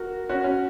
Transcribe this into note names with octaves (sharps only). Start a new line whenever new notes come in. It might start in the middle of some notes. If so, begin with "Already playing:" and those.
Already playing: F#4 A#4
C#4 F#4
C#4